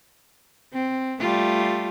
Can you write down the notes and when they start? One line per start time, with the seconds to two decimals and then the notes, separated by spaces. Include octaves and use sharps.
0.73 C4
1.20 G3 A3 F4